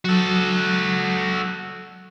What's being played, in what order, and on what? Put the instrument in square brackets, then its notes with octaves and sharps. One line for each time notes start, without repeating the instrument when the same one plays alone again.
[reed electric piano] F#3 [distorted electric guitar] F#4 A4